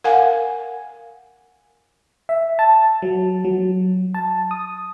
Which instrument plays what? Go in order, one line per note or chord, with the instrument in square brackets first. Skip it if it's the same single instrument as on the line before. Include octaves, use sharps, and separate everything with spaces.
[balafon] A#4 F5 F#5 G#5
[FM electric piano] E5
A5
F#3
F#3
A5
D#6